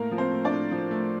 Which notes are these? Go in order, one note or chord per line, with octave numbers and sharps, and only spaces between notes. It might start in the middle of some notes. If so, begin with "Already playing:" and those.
Already playing: A2 A#3 A#4
F3
C4 C5
A3
D4 D5
A2
F3
A3